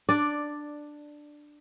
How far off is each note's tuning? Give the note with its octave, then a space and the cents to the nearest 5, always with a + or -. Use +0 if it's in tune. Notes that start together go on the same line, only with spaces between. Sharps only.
D4 +10 D5 +0